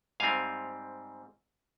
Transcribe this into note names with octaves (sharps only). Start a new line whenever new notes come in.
G#2 G3 C4 F5 G#5